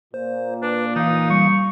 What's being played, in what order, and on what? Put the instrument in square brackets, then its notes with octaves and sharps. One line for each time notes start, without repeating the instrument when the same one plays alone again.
[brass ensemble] A#2 [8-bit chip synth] C5
[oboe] D4 [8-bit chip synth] B4
[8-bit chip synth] E3 F5 [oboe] D#4
[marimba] G3 [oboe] C#6